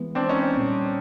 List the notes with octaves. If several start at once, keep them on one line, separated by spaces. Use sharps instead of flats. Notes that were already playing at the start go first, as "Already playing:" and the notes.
Already playing: E3 G#3 B3
C4 D4
C#4 D#4
A#2 G3 C4